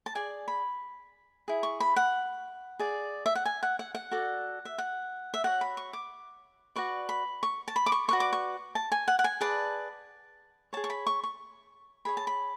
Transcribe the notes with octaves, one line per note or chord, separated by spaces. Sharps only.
A5
G#4 D5 G#5
B5
E4 G#4
C#6
B5
F#5
G#4 D5
E5
F#5
G#5
F#5
F#5
F#5
F#4 A4 D5
E5
F#5
E5
F#4 C#5 F#5
B5
C#6
D6
F#4 B4 D5 C#6
B5
C#6
A5
B5
D6
C#6
F#4 B4 D5 C#6
D6
C#6
A5
G#5
F#5
F#5
G#5
G#4 B4 D5 A5
G#4 C#5 A5
C#6
B5
C#6
C#6
G#4 C#5 B5
A5
B5